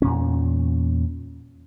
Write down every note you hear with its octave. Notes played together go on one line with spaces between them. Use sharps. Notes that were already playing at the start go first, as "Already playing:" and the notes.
E2 A#2 C#4